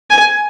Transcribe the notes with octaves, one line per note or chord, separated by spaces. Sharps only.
G#5